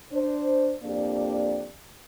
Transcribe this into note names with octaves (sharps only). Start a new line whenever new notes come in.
D4 C5
F2 A#3 D4 G4 D5